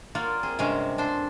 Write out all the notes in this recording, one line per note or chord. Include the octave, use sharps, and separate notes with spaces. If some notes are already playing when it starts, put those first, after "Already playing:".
A#3 F4 C#5 D5 F#5
C4 G#4
G2 C3 G#3 C4 C#4
D4 A4 C5